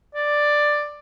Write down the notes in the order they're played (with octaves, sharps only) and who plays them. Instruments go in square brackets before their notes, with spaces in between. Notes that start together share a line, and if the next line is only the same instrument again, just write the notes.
[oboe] D5